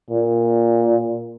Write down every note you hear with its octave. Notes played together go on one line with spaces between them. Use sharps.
A#2